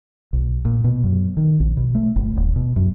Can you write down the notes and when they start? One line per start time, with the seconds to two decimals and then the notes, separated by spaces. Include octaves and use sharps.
0.33 B1
0.65 A#2
0.84 B2
1.04 F#2
1.37 D#3
1.60 A#1
1.77 B2
1.95 A3
2.16 G1
2.36 D#1
2.56 B2
2.76 F#2